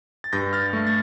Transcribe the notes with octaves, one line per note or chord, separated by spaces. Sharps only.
A6
G2 G6 A#6
F6 A6
A3
A6